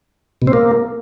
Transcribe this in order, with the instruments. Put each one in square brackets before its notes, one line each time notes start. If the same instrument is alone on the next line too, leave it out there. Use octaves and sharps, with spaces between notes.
[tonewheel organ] B2
C4
A#3